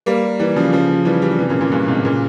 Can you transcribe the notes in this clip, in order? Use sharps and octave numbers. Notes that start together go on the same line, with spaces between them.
G3 A#3
E3 G3
C#3 F3
C#3 F3
E3 G3
E3 G3
C3 E3
A#2 C#3
A#2 C#3
G2 A#2
G#2 C3
A#2 C#3